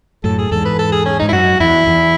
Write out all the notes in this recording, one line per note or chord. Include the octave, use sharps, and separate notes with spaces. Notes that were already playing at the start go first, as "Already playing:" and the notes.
F#2 A2 A4
G#4
E2 G#2 A4
B4
A4
G#4
C#4
G#2 D#4
E4
F#2 F#4
E2 E4
E2